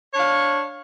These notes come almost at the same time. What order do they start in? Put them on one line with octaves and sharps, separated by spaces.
C#5 D4 F5